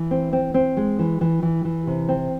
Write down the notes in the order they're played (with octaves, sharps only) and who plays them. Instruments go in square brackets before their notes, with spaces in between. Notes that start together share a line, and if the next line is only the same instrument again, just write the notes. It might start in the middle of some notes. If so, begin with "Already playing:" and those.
Already playing: [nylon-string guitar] E3
C4
C4
C4
G#3
E3
E3
E3
E3
C3
C4